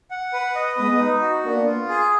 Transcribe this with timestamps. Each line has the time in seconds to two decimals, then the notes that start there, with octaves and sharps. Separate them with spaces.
0.11 F#5
0.33 B4
0.55 D#5
0.77 G#3 B3 B4
0.99 D#4
1.21 F#4
1.44 A#3 B3 D4
1.66 F4
1.89 G#4